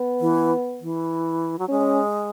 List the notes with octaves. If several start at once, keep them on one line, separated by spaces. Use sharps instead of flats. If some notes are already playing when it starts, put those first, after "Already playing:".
Already playing: B3
E3
E3
F#3
G#3 C#4